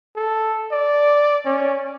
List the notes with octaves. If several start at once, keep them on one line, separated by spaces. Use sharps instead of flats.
A4
D5
C#4